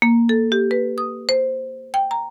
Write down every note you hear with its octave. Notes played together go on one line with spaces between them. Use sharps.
A#3
A4
G4
B4
D#6
C5
G5
A#5